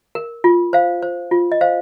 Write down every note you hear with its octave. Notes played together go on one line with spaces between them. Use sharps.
A#4
F4
C5 F5
C5
F4
D#5
C5 F5